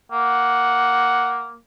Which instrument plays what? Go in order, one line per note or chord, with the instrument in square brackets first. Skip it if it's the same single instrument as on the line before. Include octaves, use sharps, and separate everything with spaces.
[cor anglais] A#3 [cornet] F#5